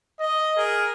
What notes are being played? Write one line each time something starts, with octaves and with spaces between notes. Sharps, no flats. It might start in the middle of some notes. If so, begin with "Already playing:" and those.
D#5
G#4 A#4